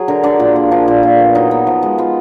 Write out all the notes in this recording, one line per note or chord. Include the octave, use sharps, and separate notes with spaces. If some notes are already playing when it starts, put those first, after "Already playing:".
Already playing: F#3 G#4
D3 A#4
D3 D5
A#2 F4
A#3
F3 D4
A#2
A#2
B3
F#3 D#4
B3
F3
G#3
B3 F4